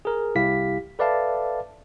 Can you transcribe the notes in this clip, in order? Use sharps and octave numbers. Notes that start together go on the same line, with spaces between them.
G#4 A#4
C2 E4 G4 F5 B6
A4 B4 D5 E5 F5 A5